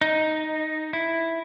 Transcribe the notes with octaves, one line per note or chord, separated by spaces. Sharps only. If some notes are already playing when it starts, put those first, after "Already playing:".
D#4
E4